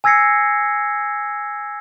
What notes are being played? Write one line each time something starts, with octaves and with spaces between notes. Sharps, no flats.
G#5 E6 G#6 A#6 C7 C#7